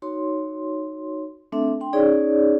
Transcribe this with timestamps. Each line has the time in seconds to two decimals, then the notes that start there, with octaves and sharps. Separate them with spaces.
0.02 D#4 F#4 C#5 C6
1.52 A3 C4 D4 A4 E5
1.81 D4 G5 C6
1.93 C#4 D#4 G#4 C#5 D5